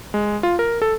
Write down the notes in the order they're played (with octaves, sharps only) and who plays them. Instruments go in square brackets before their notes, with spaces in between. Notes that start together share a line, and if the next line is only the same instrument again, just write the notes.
[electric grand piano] G#3
F4
A#4
A4